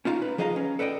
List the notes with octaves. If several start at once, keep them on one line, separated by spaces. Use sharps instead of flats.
C#4 D#4 F4 A5 A#5
B4
F3 G#4 D#5 F5 G5 A#5
C#4
A4 B4 D5 D#5 G5